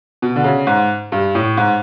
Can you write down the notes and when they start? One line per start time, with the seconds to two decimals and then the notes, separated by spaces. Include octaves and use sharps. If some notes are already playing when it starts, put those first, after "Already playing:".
0.22 B2
0.36 D3
0.44 C#3
0.67 G#2
1.12 G2
1.35 A2
1.57 G#2